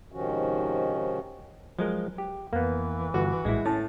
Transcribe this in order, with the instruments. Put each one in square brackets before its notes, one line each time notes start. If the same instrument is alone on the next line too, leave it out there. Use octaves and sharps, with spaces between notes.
[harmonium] G#2 C3 D#3 F3 C#4 F#4
[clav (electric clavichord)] F3 G#3 A#4 [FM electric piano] F#3
[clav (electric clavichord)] G4
[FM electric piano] F2 [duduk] E3 [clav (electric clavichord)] A#3 B3
[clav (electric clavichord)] G1 [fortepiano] F#4
[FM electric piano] A#1 A2 G3 [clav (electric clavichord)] G#3 E4
[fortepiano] A2 [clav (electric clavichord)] C#4 [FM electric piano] A4 A5